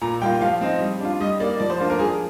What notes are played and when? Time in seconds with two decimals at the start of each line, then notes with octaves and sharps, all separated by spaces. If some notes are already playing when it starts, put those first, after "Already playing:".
0.01 A#2 A#5
0.22 G3 A#3 F4 G5
0.41 F3 F5
0.61 C4 D#4
0.81 G3
1.01 D4 F4
1.21 G3 D#5
1.40 A#3 D#4 D5
1.60 F3 D5
1.70 C5
1.80 A#3 D4 F4
1.90 A#4
2.00 F3 G#4